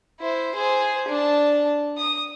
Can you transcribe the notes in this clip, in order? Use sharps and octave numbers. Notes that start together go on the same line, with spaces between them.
E4 C5
G#4 C5
D4 A5
D#6